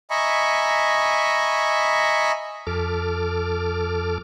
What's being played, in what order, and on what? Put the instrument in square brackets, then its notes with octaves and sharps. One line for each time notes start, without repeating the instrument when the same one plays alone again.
[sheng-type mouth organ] D#5 E5 G#5 A#5 B5 C#6
[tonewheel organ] F2 A4 D6 F6